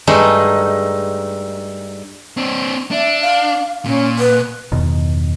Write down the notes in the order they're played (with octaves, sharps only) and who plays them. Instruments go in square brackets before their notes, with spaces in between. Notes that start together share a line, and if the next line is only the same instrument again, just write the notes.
[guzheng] G2 G#3 A3 D#4
[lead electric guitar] C4 D4
[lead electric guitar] D4 [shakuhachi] E5
[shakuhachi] F5
[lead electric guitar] A#2 [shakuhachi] C#4
[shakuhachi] B4
[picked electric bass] E2 G2 B2 D#3